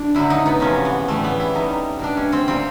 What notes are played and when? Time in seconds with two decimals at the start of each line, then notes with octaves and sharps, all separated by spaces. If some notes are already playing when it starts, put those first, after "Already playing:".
Already playing: D4
0.15 F#2 D3 F#3 E4
0.30 D#4
0.46 B3
0.60 E2 C3 F3 C#4
0.85 B3
1.08 A2 E3 G3 A3
1.24 B3
1.40 E4
1.54 B2 G3 D#4
1.99 B2 G3 D4
2.17 C#4
2.33 C4
2.48 A#2 G3 C4